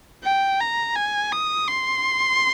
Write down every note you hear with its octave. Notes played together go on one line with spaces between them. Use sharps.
G5
A#5
G#5
D#6
C6